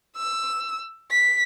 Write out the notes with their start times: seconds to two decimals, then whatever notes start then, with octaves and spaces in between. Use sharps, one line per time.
0.17 E6
1.11 B6